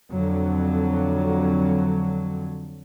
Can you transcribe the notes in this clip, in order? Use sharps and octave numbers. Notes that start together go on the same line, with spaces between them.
F2 D3 F#3